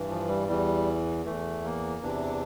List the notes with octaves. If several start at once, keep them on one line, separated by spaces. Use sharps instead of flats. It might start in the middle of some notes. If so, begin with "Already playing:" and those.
Already playing: G2 E3
F3
G3
E2 E3 G3
E2 E3 A3
A#3
E2 C3 E3 D4